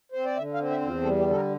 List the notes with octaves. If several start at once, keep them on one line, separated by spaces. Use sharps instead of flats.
C4 C5
D5
D3 E5
F5
C4
E5
E2
F4
G3 A4
G4
D3
A4
A#4